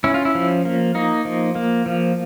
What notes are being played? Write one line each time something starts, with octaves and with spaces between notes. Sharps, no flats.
C#4 E4
F4
E4
F3
A#3
A#3 D#4
F3
A#3
F3